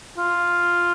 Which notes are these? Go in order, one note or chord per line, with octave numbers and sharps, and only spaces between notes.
F4